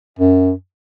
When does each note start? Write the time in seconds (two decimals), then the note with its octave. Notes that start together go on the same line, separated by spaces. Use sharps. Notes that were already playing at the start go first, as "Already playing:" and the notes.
0.19 F#2